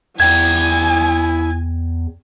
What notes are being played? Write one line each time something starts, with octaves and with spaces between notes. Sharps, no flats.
E2 E4 D5 E5 G5 G#5 G#6